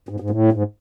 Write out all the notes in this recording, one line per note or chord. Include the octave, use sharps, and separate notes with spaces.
G#2
G#2
A2
G#2